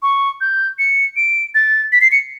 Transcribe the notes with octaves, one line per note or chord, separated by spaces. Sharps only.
C#6
G6
C#7
D7
A6
B6
C7
C#7